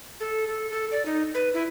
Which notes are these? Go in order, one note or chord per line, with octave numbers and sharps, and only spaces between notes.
A4
A4
A4
D5
D#4
B4
E4